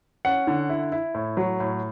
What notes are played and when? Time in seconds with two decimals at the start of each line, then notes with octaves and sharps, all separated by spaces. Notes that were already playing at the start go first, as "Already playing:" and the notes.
0.25 C#4 F#5
0.47 D3
0.69 E4
0.92 E4
1.15 A2
1.37 F#3
1.60 A2